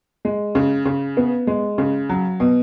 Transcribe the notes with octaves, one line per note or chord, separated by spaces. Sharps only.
G#3
C#3
C#3
B3
G#3
C#3
F#3
B2